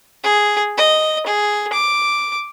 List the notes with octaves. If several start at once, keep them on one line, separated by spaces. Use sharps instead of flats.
G#4
D#5
G#4
D6